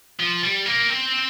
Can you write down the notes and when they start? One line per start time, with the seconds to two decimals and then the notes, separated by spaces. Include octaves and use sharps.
0.20 F3
0.43 G3
0.66 A#3
0.90 C4